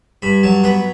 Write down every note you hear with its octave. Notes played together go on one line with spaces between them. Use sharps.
G2 B5
F#3 A5
B3 B4